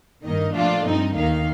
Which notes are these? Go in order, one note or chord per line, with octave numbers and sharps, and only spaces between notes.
G2 D#3 A#3 D#4 D#5
A#2 F3 A3 D4 F4 F5
G2 F3 C4 D#4 D#5
D#2 D#3 A#3 D#4 F5